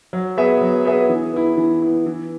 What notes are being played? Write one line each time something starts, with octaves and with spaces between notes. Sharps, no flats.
F#3
B3 G#4 B4 E5
F#3
B3 G#4 B4 E5
E3
B3 E4
E3
B3 E4
E3